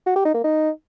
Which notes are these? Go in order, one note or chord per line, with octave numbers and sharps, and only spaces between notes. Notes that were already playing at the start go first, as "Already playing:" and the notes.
F#4
G4
D#4
A#3
D#4